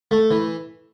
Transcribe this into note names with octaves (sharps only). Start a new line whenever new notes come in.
A3
E3